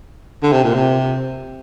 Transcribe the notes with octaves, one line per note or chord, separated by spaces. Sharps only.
D3
C3
A#2
C3